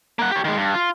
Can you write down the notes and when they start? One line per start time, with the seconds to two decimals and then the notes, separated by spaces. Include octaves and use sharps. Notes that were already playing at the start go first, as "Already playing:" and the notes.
0.19 A#3 F#5
0.31 G4 C#5
0.44 D#3 G#3
0.57 G2
0.74 F4